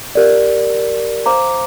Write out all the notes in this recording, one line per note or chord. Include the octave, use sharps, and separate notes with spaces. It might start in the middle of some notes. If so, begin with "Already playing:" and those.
G4 A#4 D5
C5 F5 A#5 D6